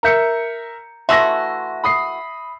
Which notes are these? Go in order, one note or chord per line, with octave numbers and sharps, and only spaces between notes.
A#4 E5 A#5 G6 C#7
E3 A3 F#4 E5 C6 E6 A#6
B5 D#6 C7